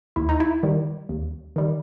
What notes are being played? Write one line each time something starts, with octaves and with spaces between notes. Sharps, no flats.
D#2 E4
D#4
E4
D#3 G3
D#2
D#3 G3